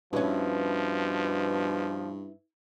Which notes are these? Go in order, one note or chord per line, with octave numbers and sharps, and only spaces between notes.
G2 B2 E3 F3 C#4